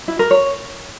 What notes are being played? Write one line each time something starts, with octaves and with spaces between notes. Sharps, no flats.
E4
A#4
C#5